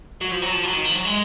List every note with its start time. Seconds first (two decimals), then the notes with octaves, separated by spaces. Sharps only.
0.21 F#3
0.31 F3
0.42 F#3
0.52 F3
0.63 F#3
0.73 D#3
0.85 F3
0.95 F#3
1.05 G#3